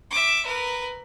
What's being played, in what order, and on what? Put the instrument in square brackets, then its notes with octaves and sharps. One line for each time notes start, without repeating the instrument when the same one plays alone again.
[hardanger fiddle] E5 D6
A#4 B4